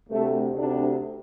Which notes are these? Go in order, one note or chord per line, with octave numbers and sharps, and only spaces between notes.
D2 C3 A3
D2 C3 D4